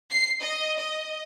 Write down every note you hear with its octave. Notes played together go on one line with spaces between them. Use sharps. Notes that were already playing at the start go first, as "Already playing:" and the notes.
C7
D#5
D#5